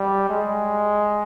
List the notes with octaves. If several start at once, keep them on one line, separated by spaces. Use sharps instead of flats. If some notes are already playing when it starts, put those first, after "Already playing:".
Already playing: G3
G#3